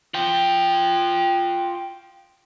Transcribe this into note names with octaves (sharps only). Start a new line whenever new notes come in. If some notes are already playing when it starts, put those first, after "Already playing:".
F4 G5